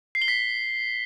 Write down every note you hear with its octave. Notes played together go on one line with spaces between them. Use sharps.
C7
G7
B6